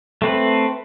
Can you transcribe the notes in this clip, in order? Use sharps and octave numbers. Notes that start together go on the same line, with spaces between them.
A3 C4 B4